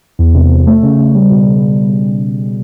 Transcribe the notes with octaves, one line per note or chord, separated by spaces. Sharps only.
E2
C3
C3
A3
C#3
C#3
G3
B2